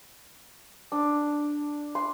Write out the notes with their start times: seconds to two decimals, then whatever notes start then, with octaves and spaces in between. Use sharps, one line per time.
0.92 D4
1.95 C6